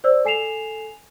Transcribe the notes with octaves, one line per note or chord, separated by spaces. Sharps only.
C5 D5 E6
A4 G#5 C7 E7 F7